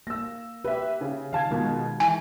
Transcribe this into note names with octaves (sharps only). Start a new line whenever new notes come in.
A#3 E6 A#6
G4 B4 E5
C#3
D#3 F5 A5 G#6
B2 D#3 G#3 F4 A#4
E3 G#5